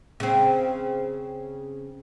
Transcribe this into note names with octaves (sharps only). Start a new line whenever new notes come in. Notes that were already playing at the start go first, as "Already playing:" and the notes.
C#3 C4